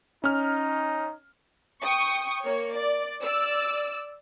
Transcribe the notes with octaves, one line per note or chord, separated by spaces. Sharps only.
C#4 D#4 F6
G5 C#6 D#6
A#3 C#5
D5
D5 E6